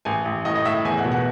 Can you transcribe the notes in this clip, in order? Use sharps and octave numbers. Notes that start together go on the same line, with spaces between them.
A1 G#5
A1
A2 D#5
D#5
A2 E5
E2 G#5
F#5
B2
F#5